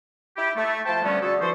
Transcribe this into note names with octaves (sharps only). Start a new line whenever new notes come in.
E4 G4
A3
F3 A3 C5 G5 A5
D3 G3 A3 B3 C#4
D3 F#4 G#4 A4
E3 F3 F#4 A4 C5